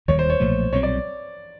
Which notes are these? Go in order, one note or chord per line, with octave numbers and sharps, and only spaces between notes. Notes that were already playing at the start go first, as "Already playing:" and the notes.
E1 D#2 D#3 G3 C#5
C5
C#5
B1 A#2 F3 A3
B1 A#2 G3 C4 C#5
D5